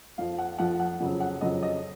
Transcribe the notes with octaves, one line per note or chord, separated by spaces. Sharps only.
F2 F3 F5
F#5
F2 F3 F#5
F#5
F2 C#3 F#3
F#5
F2 C#3 F#3 D#5
D#5